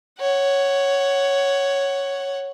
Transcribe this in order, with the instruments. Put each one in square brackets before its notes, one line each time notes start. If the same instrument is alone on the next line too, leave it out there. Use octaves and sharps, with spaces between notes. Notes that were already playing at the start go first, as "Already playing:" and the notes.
[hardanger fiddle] C#5 F#5